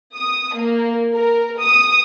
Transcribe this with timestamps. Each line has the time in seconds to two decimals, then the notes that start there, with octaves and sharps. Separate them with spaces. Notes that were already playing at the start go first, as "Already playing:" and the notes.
0.15 D#6
0.55 A#3
1.13 A#4
1.61 D#6